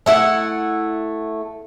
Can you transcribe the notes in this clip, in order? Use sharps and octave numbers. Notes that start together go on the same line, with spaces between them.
A3 E4 F#5